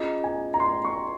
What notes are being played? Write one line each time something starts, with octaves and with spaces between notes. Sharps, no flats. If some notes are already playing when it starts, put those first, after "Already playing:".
Already playing: C#4 F4 G#4 D#5 A#5
G#5
A#5
C6
C#6